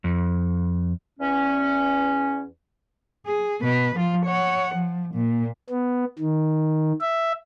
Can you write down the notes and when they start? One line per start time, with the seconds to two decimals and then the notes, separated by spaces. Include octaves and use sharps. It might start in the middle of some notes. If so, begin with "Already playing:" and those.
0.04 F2
1.19 E2 C#4
3.26 G#4
3.61 B2 B4
3.96 F3 F4
4.25 C#5 F#5
4.75 F3
5.14 A#2
5.70 B3
6.19 D#3
7.01 E5